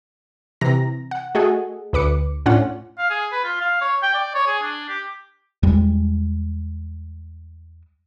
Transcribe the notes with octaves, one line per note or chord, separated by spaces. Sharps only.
C3 E3 A#5 A#6
F#5
A3 F#4 G#4 A4 D#5 F#5
D2 B4 D6 C#7
A2 C#4 D4 F4 F#5
F5
G#4
B4
F4
F5
C#5
G5
D5
C#5
G#4
D4
G4
E2 G3 G#3